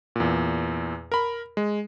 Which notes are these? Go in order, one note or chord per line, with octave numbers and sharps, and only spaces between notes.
E2 A#2
A#4 B5
G#3